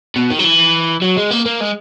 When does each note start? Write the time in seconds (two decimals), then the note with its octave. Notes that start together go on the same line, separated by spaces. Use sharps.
0.16 B2
0.30 D#3
0.39 F#3
0.44 E3
1.02 F#3
1.17 G#3
1.31 A#3
1.46 A#3
1.61 G#3